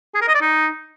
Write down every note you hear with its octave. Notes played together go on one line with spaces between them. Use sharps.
G#4
A#4
D#5
D5
D#4